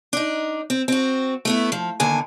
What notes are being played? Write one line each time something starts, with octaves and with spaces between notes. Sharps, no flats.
D4 D#4
C4
C4 F#4
A3 B3 E4
F3
D#2 D3 G#5